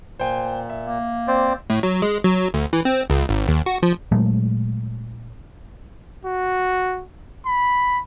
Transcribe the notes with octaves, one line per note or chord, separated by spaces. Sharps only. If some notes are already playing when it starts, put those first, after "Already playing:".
A#2 C5 G5 G#5
E5
A#3
C4 C5 D5
A2
F#3
G#3
F#3
D2
E3
C4
C#2
G#1
D#2
F#4
F3
A#2 F#3 G#3 A3
F#4
B5